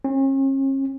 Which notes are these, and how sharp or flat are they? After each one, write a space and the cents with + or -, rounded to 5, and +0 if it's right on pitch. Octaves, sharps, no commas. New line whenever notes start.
C#4 -40